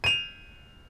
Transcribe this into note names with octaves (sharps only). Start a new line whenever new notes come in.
D#7 F7